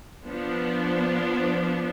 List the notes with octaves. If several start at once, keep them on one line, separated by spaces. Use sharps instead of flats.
F3 B3 D4